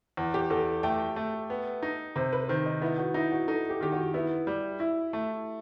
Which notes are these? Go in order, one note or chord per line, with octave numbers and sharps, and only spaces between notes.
E2
G4
E2 A4
A3 G5
A3
B3
D#4
C3 C5
B4
B4
D#3 C5
D#5
B3 E4
F#4
D#4 E4
F#4
D#4 A4
G4
D#3 G4
F#4
B3 E4
G3
E4
A3